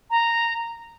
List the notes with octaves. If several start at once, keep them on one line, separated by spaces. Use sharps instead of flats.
A#5